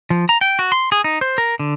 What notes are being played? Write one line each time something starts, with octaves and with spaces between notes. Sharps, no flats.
F3
A#5
G5
F#4
C6
G#4
D#4
C5
A#4
D3